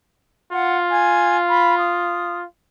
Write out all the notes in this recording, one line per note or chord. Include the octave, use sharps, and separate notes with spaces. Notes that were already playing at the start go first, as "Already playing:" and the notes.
F4 F#5
G#5
B5
D#6